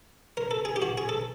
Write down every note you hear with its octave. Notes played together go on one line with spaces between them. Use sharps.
A#4
A4
G#4
G4
F#4
G#4
A4